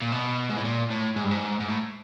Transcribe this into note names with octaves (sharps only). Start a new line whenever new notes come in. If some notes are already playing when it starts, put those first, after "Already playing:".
A#2
B2
G#2
A2
A#2
A2
G#2
G2
G#2
G#2
A2